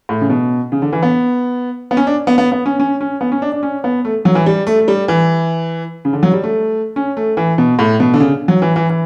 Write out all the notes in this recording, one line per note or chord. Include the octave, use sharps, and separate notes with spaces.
A2
C#3
B2
C#3
D3
E3
B3
B3
C#4
D4
B3
B3
B3
C#4
C#4
C#4
B3
C#4
D4
D4
C#4
B3
A3
F#3
E3
G3
A3
A3
G3
E3
C#3
D3
F#3
G3
A3
C#4
A3
E3
B2
A2
B2
D3
C#3
F#3
E3
E3
E3